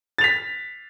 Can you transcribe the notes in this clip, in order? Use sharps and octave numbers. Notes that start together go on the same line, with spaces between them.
A6 B6 F7